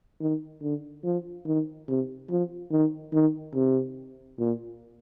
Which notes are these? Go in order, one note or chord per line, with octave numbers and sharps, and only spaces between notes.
D#3
D3
F3
D#3
C3
F3
D#3
D#3
C3
A#2